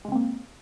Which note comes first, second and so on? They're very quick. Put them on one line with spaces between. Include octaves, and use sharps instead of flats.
G#3 C#3 C4 A#3